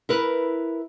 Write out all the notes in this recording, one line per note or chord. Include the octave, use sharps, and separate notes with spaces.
E4 A#4 B4